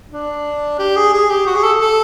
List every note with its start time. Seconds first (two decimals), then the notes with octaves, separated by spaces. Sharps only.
0.11 D4
0.79 G4
0.96 G#4
1.13 G#4
1.30 G4
1.46 F#4
1.55 G#4
1.63 A4
1.80 A4